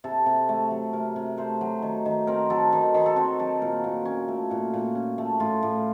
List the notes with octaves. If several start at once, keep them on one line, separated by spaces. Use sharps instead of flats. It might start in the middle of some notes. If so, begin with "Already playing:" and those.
C3 A4
C3
A3
F#3
C3 A#4
C3
A3 C5
F#3
D#3
D#3
C4 A#4
F#3 A4
D#3
D#3
A4
C4 F#4
F#3 A4
A#2 A#4
A#2
C#4
A3
A#2 F#4
A#2
C#4
A3
A2 F4
A2